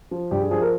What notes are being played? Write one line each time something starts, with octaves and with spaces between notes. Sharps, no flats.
F3
G2 G4
G#4
F3 G#4
A#4